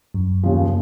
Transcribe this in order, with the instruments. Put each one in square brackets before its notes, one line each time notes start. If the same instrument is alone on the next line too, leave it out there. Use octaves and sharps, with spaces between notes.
[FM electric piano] F#2
[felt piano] D#2 C#3 F3